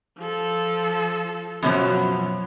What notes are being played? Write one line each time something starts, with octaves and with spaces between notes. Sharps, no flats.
F3 A4
F#2 B2 F3 F#3